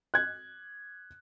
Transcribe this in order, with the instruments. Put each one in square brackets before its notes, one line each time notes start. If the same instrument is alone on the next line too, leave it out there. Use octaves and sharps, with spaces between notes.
[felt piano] F#6 G#6